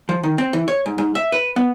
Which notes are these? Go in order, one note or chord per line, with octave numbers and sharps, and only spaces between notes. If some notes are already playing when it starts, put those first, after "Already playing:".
F3
D#3
C4
E3
C#5
G#2
G#2
E5
B4
B3